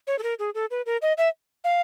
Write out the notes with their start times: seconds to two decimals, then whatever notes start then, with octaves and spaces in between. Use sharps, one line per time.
0.07 C#5
0.18 A4
0.23 A#4
0.39 G#4
0.54 A4
0.71 B4
0.86 A#4
1.02 D#5
1.18 E5
1.64 F5